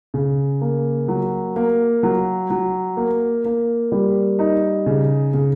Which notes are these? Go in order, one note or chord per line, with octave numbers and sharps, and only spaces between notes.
C#3
A#3
F#3
A#3
F#3
F#3
A#3
A#3
G3
D#4
C#3
C#3